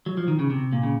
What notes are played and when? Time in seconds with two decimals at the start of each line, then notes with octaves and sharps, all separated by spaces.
0.06 F#3
0.17 F3
0.28 D#3
0.39 C#3
0.50 C3
0.73 A#2
0.83 C#3